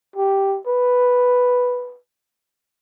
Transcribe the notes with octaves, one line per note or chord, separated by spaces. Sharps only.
G4
B4